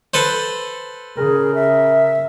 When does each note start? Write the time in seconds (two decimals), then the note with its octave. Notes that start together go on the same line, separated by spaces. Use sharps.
0.14 A4 B4 C5
1.17 C#3 G#4 A#4
1.55 E5